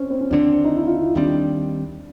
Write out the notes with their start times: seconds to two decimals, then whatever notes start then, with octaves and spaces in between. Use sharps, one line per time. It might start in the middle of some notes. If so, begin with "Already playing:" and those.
Already playing: C4 C#4
0.10 C4
0.21 C#4
0.30 D#2 D3 G3 C4 D4
0.64 D#4
0.76 E4
0.87 F4
1.02 E4
1.15 D#2 D#3 G3 C4 D4